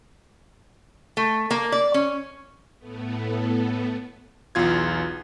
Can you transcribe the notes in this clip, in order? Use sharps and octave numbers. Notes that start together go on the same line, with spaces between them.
A3
A#3
D5
C#4
A2 A3 B3
B1 E2 F4 G#6